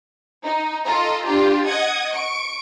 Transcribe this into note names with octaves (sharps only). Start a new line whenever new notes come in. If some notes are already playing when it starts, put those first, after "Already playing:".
D#4
F4 A4 D#5 A#5
D4 F4 G4
D#5 F#5 D#6 G#6
C#6 D7